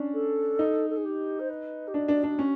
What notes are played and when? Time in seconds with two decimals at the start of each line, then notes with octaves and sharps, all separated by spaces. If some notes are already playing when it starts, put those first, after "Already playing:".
Already playing: C#4 D4
0.13 A4
0.59 D#4
0.89 A4
0.97 G#4
1.04 G4
1.39 C5
1.49 B4
1.87 G4
1.94 D4 F#4
2.08 D4
2.23 D4
2.39 C#4